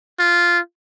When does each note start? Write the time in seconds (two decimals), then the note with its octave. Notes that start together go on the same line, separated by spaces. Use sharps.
0.19 F4